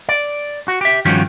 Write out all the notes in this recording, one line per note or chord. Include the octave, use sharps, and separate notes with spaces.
D5
F#4
G4 E5
G2 D#3 F3 C#4 F#4 G4